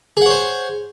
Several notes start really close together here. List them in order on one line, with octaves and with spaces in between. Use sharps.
G#4 F#5 C#5 C5